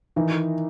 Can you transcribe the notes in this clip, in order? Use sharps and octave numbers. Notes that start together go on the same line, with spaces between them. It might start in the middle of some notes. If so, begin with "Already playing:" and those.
D#3 E3 D#4